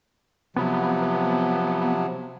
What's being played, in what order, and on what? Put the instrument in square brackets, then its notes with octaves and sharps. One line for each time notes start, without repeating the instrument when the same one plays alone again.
[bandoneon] C3 F3 F#3 [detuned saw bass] B3